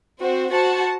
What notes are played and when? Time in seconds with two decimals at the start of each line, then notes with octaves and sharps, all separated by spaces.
0.19 C4 F#4 C5
0.50 F#4 C5 F#5 A5